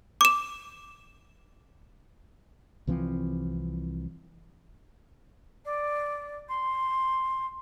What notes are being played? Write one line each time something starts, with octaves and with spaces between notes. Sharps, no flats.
D6 E7
C2 E3 F3 C4
D5
C6